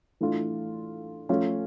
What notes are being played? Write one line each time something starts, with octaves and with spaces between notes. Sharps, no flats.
E3 A3 D4 F4
F3 A3 C#4 F4